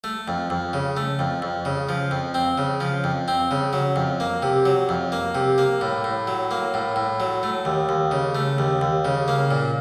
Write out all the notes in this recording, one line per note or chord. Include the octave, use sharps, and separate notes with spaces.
A3
F2
F2
C#3
A3
F2
F2
C#3
F3
F2
C4
C#3
F3
F2
C4
C#3
F#3
F2
A#3
C3
F#3
F2
A#3
C3
A#3
A2
A2
F#3
A#3
A2
A2
F#3
A3
D#2
D#2
C#3
A3
D#2
D#2
C#3
A#3
A#2